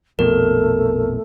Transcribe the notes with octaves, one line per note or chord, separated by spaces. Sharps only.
A#1 F2 B2 A3 A#4